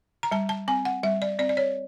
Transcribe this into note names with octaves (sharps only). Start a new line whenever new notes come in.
A#5
G3 A5
A5
C4 G#5
F#5
G3 E5
D5
C4 D5
D5
C#5